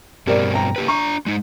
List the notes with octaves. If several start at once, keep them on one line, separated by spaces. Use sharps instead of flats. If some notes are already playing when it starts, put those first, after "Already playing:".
G2 B2 C4 G4 A#4 D5
G5 A#5
A#3 G4 B4
D4 A#5 C#6
G#3 D#4